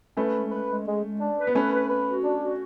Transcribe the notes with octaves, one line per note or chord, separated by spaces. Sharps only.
A3 C#4 B4
G#3
B4
G#3
G#3
G#3
D4
B4
B3
A3 C#4 B4
B4
B4
F#4
D4
F#4